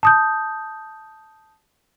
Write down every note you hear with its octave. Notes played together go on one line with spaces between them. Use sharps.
A5 D#6 G6